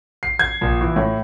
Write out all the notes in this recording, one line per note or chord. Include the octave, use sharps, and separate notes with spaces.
C7
G#6
A#1
E3
A2